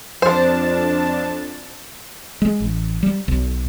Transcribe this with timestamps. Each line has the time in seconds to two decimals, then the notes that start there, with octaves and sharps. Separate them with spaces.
0.22 F2 F3 D4 C5 A5
2.42 G#3
2.60 A1
3.03 G3
3.28 B1